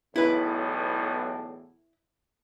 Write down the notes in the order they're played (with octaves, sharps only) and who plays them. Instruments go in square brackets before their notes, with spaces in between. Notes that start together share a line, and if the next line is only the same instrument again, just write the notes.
[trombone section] B1 E2 A2 [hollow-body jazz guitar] E4 B4